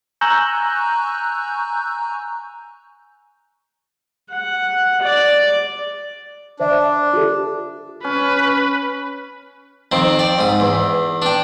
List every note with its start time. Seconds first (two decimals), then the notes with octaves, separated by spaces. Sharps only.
0.21 G#5 A#5 C#6 E6 F#6 G6
4.32 F#5
5.02 D5
6.60 D4 C5 D5 E5
7.13 F4 G4 A4
8.04 C#4 B4
9.92 F2 D#3 C4
10.19 D5 G5
10.39 G#2 D#6
10.60 E2
11.22 D4 G5